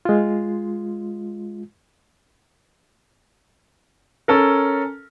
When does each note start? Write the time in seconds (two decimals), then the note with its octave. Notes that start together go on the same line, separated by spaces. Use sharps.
0.05 G#3 F4
4.28 C#4 A4 A#4